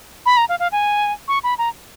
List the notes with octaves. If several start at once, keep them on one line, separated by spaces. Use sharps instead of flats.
B5
A#5
F5
F5
G#5
C#6
B5
A#5